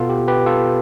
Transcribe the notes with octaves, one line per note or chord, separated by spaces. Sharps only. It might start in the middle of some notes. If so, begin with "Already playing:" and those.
Already playing: B2 B3 F4 A4
G4
G4 B4
F4 A4